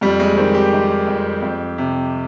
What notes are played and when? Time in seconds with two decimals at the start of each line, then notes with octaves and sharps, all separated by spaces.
0.01 F2 G3
0.20 G#3
0.37 D#3 C4
0.54 G4
0.73 D#3
1.07 F2
1.42 F2
1.78 C3